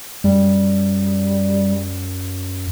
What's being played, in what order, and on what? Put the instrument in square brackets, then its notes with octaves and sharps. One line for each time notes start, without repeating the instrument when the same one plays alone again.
[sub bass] F#2 [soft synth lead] G3